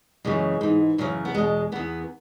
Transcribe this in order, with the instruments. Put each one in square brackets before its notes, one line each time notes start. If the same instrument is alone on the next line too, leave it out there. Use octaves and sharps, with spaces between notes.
[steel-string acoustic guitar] F#2 C#3 E3 G#3
G#2 E3
F#2 C#3 E3 F#3
B3
E2 B2 G#3
E2 E3 B3